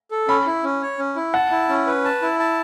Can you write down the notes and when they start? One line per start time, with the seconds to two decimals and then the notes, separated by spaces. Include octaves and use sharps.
0.11 A4
0.28 C#4 B5
0.46 E4
0.64 C#4
0.82 C#5
0.99 C#4
1.16 E4
1.34 F#5 A5
1.51 E4
1.69 C#4
1.87 B4
2.05 A5
2.22 E4
2.40 A5